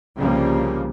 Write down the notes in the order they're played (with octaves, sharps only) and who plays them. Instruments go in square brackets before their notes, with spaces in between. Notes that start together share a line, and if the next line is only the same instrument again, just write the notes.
[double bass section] C2 C#3 F3 G3 A#3